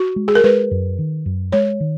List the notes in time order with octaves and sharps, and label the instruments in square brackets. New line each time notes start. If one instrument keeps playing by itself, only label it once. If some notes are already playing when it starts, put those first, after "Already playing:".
Already playing: [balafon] F#4
[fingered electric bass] G#3
[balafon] G#4
A#4
[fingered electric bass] G#3 [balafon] B4
[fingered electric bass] F#2
D#3
F#2
[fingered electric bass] G#3 [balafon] C#5
[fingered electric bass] D#3